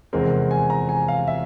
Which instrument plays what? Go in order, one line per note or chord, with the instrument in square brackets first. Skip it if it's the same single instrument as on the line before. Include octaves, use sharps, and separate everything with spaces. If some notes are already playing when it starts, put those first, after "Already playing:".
[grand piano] F1 E2 E3 G#3 C4 A#4
G#5
A#5
G#5
F5
E5